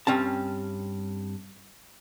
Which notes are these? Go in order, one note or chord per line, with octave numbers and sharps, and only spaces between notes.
G2 C4 C#4 A5